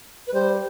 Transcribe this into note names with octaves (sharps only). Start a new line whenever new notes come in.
B4
G3 C5